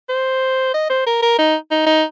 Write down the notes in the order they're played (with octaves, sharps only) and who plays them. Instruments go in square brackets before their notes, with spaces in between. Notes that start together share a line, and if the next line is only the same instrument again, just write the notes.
[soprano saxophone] C5
D#5
C5
A#4
A#4
D#4
D#4
D#4